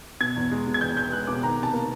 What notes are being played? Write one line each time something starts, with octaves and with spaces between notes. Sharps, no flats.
B2 G#6
E2
G#3
B2
G#6
E2 G6
E2 G6
G#3 F#6
B2 D6
D#3 A#5
C3
A5
A#3